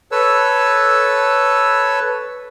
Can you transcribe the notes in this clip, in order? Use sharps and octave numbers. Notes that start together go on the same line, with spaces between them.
A4 B4 C#5 E6